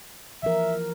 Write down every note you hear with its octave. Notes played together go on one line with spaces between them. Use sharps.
E3 F3 A#4 E5